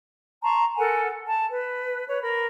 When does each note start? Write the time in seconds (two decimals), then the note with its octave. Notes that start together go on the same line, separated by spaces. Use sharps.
0.42 A5 A#5 C6 C#6
0.77 A4 A#4 F#5 G#5
1.28 A5
1.49 B4
2.07 B4 C#5
2.21 A#4 B5